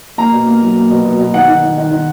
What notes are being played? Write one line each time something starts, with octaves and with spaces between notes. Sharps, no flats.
A#3 A#5
B2
A#3
F#3
A#3
B2
B2
B2
D#3 F#5
D#3
D#3
D#3
D#3